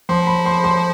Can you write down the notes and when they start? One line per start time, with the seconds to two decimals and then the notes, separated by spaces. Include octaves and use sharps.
0.09 F3 C6
0.27 B5
0.46 C6
0.64 C6